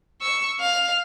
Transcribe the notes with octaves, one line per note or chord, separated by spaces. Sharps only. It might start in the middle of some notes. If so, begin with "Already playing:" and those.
C#6 E6
F5 F7